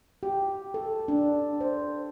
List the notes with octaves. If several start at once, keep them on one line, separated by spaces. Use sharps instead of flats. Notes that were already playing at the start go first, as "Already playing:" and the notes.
G4
A4
D4
C5